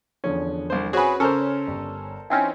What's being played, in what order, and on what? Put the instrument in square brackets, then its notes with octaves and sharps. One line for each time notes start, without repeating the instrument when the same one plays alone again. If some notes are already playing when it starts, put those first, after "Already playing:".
[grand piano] E2 D3 F3 [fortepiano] C#4
[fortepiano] C2 C5
[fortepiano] C4 C#4 F#4 [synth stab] G#4 B4
[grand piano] C#3 [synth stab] C#4 [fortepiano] A4 A#4 C5
[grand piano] G1
[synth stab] E3 C4 C#4 [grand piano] D#4